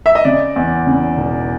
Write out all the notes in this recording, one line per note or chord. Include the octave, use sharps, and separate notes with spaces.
E5
D#5
C#3 D5
E2
C#3
E1